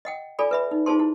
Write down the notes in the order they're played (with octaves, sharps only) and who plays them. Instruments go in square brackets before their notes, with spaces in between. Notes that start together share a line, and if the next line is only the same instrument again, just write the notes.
[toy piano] D#5 F#5 G5
F4 A4 D5 G#5 B5
B4 E5 B5
D#4
D#4 F4 G#4 C5 A5 C6
E4